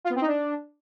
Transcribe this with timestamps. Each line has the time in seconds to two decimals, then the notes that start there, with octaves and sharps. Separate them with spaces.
0.05 F4
0.10 B3
0.16 C4
0.21 D#4
0.27 D4